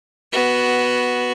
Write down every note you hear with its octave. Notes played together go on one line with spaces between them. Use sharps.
B3 F#4